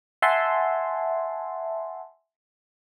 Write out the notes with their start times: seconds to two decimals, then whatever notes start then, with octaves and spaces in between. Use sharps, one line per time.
0.22 E5 F#5 G#5 A5 C6